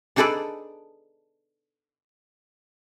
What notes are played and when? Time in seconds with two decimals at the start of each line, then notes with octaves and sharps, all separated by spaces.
0.16 D4 D#4 G#4 A4 B4 D5